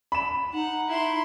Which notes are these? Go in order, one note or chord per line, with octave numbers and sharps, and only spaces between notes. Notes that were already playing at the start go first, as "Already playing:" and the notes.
B5 E7
D#4 F#5
E4 C6